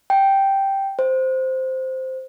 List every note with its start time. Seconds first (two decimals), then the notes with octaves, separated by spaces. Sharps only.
0.10 G5
0.99 C5